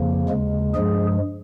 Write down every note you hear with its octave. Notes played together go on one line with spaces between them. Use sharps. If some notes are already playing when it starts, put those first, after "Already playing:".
Already playing: F2 C#3 F3 A#3
D#2 C#3 G#3
G2 F3 G#3 G#4